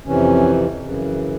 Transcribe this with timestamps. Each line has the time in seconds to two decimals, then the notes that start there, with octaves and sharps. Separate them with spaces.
0.05 F2 C3 E3 C#4
0.81 F#2 C#3 E3